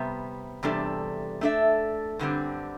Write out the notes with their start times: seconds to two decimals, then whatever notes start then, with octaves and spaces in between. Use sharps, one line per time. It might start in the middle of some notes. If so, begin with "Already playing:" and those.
Already playing: C3 G3 B3
0.63 E2 C3 G3 D4 A4
1.41 A3 D4 A4 E5
2.19 G2 D3 G3 C4